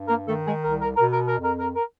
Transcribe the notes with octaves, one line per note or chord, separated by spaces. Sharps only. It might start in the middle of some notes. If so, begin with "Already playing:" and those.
Already playing: G2
A#3 A#4
D#3 A3 A4
G#3 G#4
C2 A#4
A#4
A#4
B2
A#4
A#4
F2
A#4
A#4
A#4